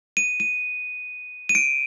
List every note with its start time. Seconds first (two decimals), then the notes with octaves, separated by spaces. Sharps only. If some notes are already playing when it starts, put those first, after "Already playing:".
0.17 D#7
0.40 D#7
1.49 D#7
1.55 D7